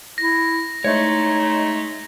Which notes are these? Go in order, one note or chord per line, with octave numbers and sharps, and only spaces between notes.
E4 A#6
G#3 A3 D#4 C#5